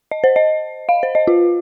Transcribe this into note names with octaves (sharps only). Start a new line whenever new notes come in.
D#5
C5
D#5
F5
C5
D#5
F4